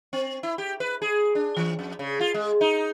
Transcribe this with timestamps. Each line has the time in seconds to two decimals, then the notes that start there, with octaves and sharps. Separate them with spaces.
0.13 C4
0.43 E4
0.58 G4
0.80 B4
1.02 G#4
1.35 D4
1.57 E3
1.79 F2
1.99 C#3
2.20 F4
2.34 G#3
2.61 D#4